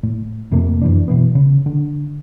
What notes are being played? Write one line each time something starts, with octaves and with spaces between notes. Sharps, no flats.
A2
F2 C3 A3 A#3
F#2 E3 D4
B2 E3 B3
C#3
D3